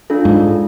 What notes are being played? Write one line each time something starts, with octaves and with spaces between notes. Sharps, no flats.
D4 F4 A4
G#2